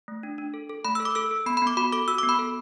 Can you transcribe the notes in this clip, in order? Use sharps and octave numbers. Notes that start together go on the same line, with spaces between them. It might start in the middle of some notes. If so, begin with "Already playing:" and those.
A3
D4
D4
A4
A4
A3 B5
E6
A4
D6
A4 E6
A4
B3 B5
B5
B3
D6
F#4 B5
A4 D6
F#4 E6
D6
B3
B5
A4